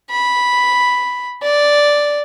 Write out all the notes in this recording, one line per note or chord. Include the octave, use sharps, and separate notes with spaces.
B5
D5